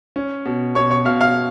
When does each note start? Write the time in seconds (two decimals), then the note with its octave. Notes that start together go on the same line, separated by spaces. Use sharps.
0.16 C#4
0.45 B2
0.75 B2 C#5 C#6
0.91 C#5 C#6
1.05 B2 F5 F6
1.21 F5 F6